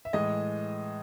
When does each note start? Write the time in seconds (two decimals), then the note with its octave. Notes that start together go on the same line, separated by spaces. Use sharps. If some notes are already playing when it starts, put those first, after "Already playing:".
0.05 E5
0.13 A2 E3 G#3 D#5